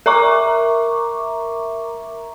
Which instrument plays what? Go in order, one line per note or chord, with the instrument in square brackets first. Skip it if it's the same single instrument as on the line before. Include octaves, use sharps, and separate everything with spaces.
[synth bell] A#4 E5 A#5 C#6 D6